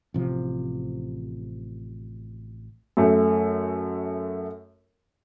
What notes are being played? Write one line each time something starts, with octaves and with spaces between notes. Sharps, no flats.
A1 C3 F3
F#2 A3